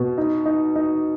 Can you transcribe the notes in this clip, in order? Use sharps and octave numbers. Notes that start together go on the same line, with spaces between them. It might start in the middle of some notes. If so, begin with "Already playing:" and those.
Already playing: B2
D#4
D#4
D#4